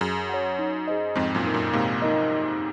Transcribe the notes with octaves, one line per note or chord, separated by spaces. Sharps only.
F#2 G#4
C#5 F#5
D#4
G#4 C5 D#5
F2 G#2 C4
F#2 A#2
D#4 A#4
F#2 A#2
G#2 C3 A#3
D#4 A#4 D#5
D#4